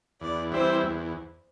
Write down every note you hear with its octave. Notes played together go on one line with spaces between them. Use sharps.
E2 D5
E3 G3 C4 E4 C5
E2